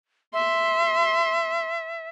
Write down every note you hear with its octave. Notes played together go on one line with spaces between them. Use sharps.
E5 C6